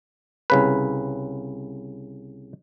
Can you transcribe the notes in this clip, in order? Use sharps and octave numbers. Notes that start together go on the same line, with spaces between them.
C2 C#3 B4